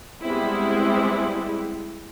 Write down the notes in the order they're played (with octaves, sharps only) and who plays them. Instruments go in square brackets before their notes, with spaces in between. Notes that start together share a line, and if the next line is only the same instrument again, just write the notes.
[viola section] G3 G#3 B3 C4 E4